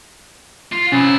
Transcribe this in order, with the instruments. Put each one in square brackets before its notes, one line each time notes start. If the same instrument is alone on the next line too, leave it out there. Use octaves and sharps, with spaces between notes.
[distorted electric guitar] F4
[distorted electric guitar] C2 E4 [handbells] C#4 A6